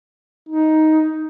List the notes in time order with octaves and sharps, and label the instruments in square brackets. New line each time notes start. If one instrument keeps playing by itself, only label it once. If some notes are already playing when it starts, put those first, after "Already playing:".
[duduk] D#4